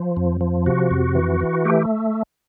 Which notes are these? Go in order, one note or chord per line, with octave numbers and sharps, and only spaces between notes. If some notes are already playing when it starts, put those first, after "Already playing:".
Already playing: F3
F2
F3
C3 F#4
F2
E3
E3
A3 G4